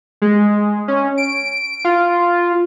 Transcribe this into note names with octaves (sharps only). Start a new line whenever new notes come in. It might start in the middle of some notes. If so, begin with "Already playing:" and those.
G#3
C#4
D7
F4